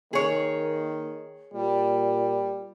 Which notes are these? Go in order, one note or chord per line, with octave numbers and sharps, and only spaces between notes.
D#3 A#3 G#4 C#5
A#2 G3